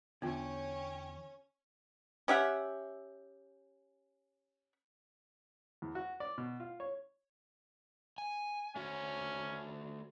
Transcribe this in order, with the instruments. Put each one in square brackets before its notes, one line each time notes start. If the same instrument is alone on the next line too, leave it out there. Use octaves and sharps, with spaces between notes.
[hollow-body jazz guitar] E2 D3 [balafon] B3 F4 [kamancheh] C#4 C#5 [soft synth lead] G5
[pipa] C#4 G4 E5 F#5
[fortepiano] E2
F#4
D5
B2
F4
C#5
[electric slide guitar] G#5
[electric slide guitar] A3 F#4 [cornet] C#4